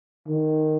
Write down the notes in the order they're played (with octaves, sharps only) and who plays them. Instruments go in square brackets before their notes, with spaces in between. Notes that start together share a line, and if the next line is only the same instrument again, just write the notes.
[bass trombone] D#3